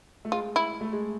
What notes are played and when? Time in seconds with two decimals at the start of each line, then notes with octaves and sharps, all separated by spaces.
0.25 A3
0.32 G#3 F4
0.56 E4
0.81 A3
0.93 G#3